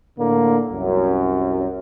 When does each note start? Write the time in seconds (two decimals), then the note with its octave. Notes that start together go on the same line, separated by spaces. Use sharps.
0.17 A2 D3 A#3
0.69 C2 F#2